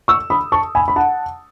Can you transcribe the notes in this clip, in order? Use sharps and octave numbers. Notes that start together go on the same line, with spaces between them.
C#6 E6
B5 D#6
A5 C#6
G#5 B5
B5
F#5 A5